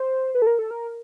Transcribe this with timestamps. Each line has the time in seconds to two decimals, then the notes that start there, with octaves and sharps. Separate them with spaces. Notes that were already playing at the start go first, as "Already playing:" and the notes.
Already playing: C5
0.35 B4
0.42 A4
0.47 A#4
0.59 A4
0.71 A#4